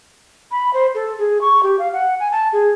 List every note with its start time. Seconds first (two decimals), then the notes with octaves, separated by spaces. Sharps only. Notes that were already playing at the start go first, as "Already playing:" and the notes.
0.51 B5
0.73 C5
0.94 A4
1.18 G#4
1.41 C#6
1.62 G4
1.79 F5
1.93 F#5
2.19 G#5
2.31 A5
2.52 G#4